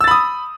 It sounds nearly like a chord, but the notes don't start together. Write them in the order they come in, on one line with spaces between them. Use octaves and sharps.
E6 A6 B5 D#6